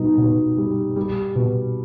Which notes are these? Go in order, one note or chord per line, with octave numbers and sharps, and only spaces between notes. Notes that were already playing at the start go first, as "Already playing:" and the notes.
Already playing: B2 G3 D#4
B2
G3
G3
B2